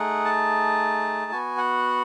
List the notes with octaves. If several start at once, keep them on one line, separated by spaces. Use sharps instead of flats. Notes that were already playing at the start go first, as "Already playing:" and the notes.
Already playing: A3 D#4 G#4 F#5
A5
B3 F#4 G#5
F#5